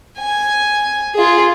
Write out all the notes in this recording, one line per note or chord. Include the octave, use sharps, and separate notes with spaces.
G#5
F4 G#4